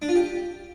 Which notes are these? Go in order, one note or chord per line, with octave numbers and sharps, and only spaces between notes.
D4
F4
G4